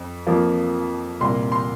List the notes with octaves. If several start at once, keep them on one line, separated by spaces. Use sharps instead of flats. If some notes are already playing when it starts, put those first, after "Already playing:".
Already playing: F2
F2 F3 A#3
C2 A#2 A#3 C6
C6